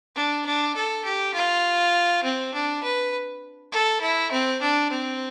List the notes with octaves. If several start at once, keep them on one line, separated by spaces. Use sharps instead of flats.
D4
D4
A4
G4
F4
C4
D4
B4
A4
E4
C4
D4
C4